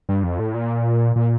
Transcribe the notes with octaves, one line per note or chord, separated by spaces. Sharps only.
G2
F2
A2
A#2
A#2